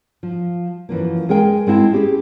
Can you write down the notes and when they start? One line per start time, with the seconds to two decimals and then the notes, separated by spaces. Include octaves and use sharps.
0.23 F3
0.89 F#2 E3 F3 A#3
1.29 G#3 G#4 A#4 G5 G#5
1.67 G#3 C4 E4 F#5 A5
1.92 C#4 G4 G#4